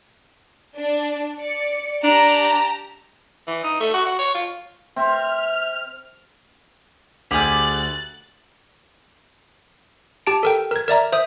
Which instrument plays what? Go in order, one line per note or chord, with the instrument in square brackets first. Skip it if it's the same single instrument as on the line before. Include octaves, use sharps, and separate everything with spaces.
[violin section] D4
D5 C#7
[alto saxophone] D4 [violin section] G4 A5 A#5
[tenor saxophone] E3
D#4
A3
F#4
F#4
C#5
F4
[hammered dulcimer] C4 [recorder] E5 [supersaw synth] F6
[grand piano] D2 [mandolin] G4 G#4 F6 [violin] F#6 A6
[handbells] G4 A5 D7
A4 A#4 G5
A#4 G#6
A#4 D5 E5 A#5
C5 E5 D#6